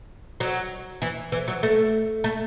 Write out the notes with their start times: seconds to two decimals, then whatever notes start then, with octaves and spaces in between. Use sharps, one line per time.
0.40 F#3
1.02 E3
1.32 E3
1.48 F#3
1.63 A3
2.24 A3